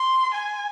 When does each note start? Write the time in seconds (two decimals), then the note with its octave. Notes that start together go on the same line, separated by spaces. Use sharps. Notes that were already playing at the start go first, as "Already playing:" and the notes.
Already playing: C6
0.34 G#5